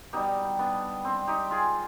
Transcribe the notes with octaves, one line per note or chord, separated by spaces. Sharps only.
B2 G3 D#4 G4
B3 D4
C4
D#4 G4
F4 G#4